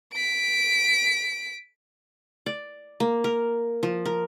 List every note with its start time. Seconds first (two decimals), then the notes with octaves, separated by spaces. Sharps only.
0.13 B6 D7
2.46 D5
3.00 A#3
3.24 A#4
3.83 F3
4.05 A#4